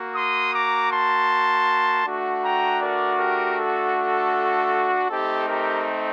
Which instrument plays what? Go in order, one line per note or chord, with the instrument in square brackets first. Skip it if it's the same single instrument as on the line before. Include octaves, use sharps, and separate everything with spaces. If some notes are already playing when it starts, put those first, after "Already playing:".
Already playing: [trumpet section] A#3 F#4
C6 D#6
A#5 D6
A5 C6
A3 D4 F#4
G5 A#5
A#4 D5
G4 A#4
A4
A4
A3 C4 D#4 G4 A4
G4 A#4